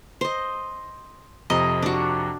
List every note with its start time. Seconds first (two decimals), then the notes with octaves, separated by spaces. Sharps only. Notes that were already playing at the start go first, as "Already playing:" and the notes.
0.21 C5 D#5
1.50 F2 C3 D#5 A#5
1.83 D4 F#4